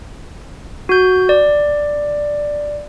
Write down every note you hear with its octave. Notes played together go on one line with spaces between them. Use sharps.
F#4 G6
D5